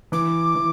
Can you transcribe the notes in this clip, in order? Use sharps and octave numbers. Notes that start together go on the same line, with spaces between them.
E3 D6
E3